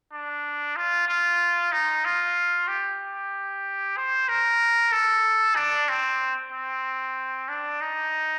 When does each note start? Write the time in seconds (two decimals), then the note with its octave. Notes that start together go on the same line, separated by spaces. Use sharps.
0.12 D4
0.76 F4
1.08 F4
1.72 D#4
2.05 F4
2.68 G4
3.97 C5
4.29 A#4
4.92 A4
5.56 D4
5.89 C4
6.53 C4
7.48 D4
7.81 D#4